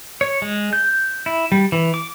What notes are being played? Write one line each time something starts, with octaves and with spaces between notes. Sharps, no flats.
C#5
G#3
G6
E4
G3
E3
D6